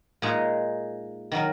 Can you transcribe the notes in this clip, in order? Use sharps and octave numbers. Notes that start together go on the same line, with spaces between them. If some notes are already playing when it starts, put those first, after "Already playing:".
A#2 G#3 D#4 G#4 C#5
D#3 F#3 D#4 A#4